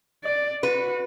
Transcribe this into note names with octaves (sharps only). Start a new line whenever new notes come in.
D5
F#4 B4